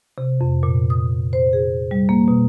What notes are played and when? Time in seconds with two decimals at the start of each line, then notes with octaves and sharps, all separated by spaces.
0.18 C3
0.41 F2
0.63 A#2
0.90 D#6
1.33 C5
1.53 G#4
1.91 G3
2.09 A#3
2.28 B2